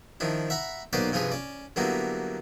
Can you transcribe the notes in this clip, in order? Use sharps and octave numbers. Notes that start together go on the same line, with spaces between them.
D#3 F3 D4 E4
E5 F#5 A#5 B5
B1 A#3 B3 B4 C5 D5
G2 C3 F3 F4 G#4 B4
C#4 D5
D3 F#3 G3 A#3 B3 E4